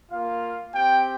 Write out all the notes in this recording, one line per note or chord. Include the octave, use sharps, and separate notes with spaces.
A#3 F4 F5
C4 G4 G5